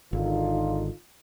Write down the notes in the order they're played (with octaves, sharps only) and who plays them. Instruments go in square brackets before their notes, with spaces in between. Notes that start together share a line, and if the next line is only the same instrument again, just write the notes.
[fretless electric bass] G#1 [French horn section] D3 D#4 F4